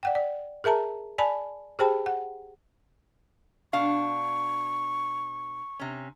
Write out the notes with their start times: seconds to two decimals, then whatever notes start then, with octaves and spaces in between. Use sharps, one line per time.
0.03 D5 F#5 G5
0.15 D5
0.64 G#4 A#4 E5 A5 A#5
1.18 D5 G#5 A5 B5
1.79 G4 G#4 C5 G5 A5 B5
2.06 F#5
3.73 B2 D4 F5 C#6
5.80 C3 C#4